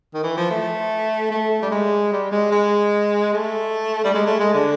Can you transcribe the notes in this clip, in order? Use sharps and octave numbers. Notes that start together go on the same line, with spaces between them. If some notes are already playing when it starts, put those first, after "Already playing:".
D#3
E3
F3
A3
A3
G3
G#3
G3
G#3
G#3
A3
G3
G#3
A3
G#3
D3